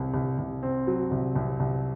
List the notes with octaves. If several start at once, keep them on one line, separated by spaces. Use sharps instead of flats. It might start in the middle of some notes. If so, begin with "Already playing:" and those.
Already playing: C2 C3
C2
C2
C4
F#3
C2
C2
C2